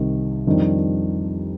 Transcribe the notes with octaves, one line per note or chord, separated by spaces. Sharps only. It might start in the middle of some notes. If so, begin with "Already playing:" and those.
Already playing: C2 C3 D#3
F2 D#3 G3 D4